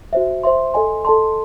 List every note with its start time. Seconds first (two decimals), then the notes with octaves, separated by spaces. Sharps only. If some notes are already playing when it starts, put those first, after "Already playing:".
0.13 F#4 C5 E5
0.44 C5 E5 C6
0.74 A4 D#5 G#5 C6
1.05 A4 D#5 A5 C6